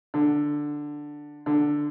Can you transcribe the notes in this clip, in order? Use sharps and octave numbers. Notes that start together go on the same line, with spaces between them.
D3
D3